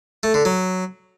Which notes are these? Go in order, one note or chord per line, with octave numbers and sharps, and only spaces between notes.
A3
D3
F#3